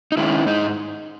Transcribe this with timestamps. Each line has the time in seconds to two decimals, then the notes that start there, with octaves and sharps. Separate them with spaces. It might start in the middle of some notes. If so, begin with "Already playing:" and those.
0.12 D#4
0.17 D#3 G#3 C#4 E4
0.47 G#2 D#4